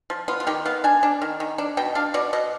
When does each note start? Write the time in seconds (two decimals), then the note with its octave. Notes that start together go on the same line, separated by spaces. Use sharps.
0.10 F3
0.28 B3 F4
0.40 F4
0.47 D#3 G4
0.65 B3 F5
0.84 D4 G#5
1.03 D4
1.22 D#3
1.40 D#3
1.58 D4
1.77 B2 G5
1.95 D4 F5
2.14 B2 D5
2.33 B2 D#5